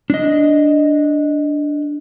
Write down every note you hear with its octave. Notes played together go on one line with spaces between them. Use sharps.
D4 D#5